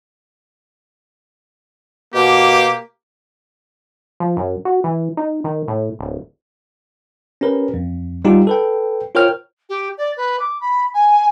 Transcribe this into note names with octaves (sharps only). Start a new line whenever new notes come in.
B2 A#3 G4
F3
F#2
F#4
E3
D#4
D#3
A2
D1
C#4 G4 A#4 B4
F2
G3 D#4 F4 G4
A4 B4 G5
F4 A#4 C5 C#5 G5 F6
G4
D5
B4
D6
B5
G#5